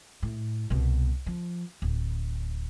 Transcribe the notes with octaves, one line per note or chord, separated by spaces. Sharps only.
A2
C2 B2
F3
D1